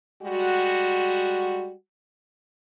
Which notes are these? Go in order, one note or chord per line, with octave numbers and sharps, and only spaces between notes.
G3 G#3 F#4